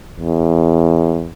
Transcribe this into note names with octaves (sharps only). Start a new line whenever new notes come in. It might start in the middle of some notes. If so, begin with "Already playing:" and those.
E2